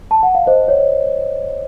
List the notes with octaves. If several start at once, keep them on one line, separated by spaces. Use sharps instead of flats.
A5
F#5
F5
C5 D#5
C#5